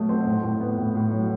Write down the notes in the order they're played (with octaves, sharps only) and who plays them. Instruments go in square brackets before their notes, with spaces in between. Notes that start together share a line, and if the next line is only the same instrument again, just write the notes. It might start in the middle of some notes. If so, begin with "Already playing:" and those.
Already playing: [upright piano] B2 F#3 A3
C4
A2
A2
B3
A2
A2
F#3